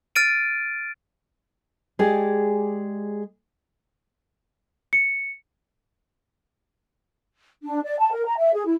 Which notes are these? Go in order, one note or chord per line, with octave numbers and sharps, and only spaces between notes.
F6 A6 D7 D#7
G#3 G4 G#4 D5
C#7
D4
D5
A5
A#4
A#5
E5
G#4
E4